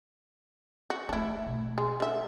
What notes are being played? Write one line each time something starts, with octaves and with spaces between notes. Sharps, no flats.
F#4
A3 C4 D4 E4
B2
G#3
D3 E5